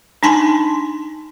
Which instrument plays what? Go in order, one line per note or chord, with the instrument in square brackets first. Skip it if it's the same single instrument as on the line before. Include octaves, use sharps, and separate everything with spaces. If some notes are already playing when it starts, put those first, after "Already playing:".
[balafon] D4 D#4 G#5 A5 C6